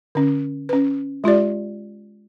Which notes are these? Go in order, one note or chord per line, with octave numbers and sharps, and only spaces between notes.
D3 C#4
C#4 B4
G#3 F4 G4 D5